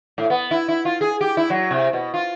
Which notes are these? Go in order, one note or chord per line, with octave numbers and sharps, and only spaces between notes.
A2
B3
E4
E4
F4
G#4
G4
E4
F#3
C3
B2
F4